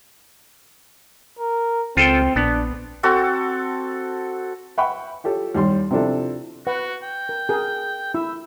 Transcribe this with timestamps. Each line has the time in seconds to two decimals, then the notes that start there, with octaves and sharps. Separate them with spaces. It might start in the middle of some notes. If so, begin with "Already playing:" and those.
1.39 A#4
1.97 C#2 C4 F4 A4 G5
2.36 A#1 B3 D4
3.03 C4 F#4 A4
4.78 E5 F#5 G5 B5 C#6
5.24 F4 G4 A4 C#5
5.55 D#2 G3 D5 C6
5.91 C3 F3 C4 D4 E4 A4
6.67 F#4 B4 F#5
7.03 G5
7.29 A#4
7.49 G#4 A#4
8.14 E4 E5